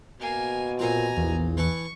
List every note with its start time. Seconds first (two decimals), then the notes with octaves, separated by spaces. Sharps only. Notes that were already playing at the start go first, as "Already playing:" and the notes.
0.20 B2 A#3 G#5
0.79 A#2 C4 F4 G#5 A#5
1.17 A#1 E2
1.57 E3 B4 A5 C#6